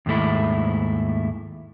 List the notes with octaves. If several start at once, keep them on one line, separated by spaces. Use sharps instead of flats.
D#2 G#2 A3 E4